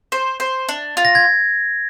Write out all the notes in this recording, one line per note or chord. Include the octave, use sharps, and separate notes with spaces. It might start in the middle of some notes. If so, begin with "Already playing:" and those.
C5
C5
D4
F4
A#6
G#6